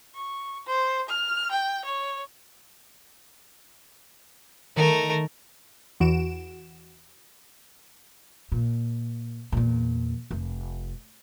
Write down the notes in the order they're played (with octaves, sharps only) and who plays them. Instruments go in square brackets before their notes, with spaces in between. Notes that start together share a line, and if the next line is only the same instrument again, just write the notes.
[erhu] C#6
C5
F6
G5
C#5
[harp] D#3 [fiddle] A3 A#4
[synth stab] E2 E3 F#4 D7 E7
[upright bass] A#2
E2 A#2
F1